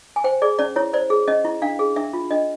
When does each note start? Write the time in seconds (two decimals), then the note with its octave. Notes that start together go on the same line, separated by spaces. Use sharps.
0.16 G#5
0.24 C5 G5
0.42 G#4 D5
0.59 C#4 D5
0.76 E4 C#5
0.93 C5 D5
1.10 G#4
1.28 C#4 D#5
1.45 E4
1.62 D4 F5
1.79 G#4
1.96 D4 E5
2.13 F4
2.31 D4 D#5